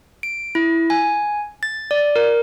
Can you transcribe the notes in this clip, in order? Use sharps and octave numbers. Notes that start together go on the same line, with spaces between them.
D7
E4
G#5
A6
D5
A#4